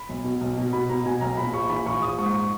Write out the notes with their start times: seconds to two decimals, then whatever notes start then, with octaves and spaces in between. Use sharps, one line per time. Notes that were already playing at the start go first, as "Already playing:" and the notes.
Already playing: B5
0.09 B1
0.24 B2
0.41 B1
0.58 B2
0.73 B2 B5
0.89 B2 A#5
1.06 B2 G#5
1.21 B1 A#5
1.37 A#1 B5
1.53 A#1 C#6
1.69 E3 B5
1.86 A#1 C#6
2.02 A#1 D#6
2.18 G#2 C#6
2.34 C#6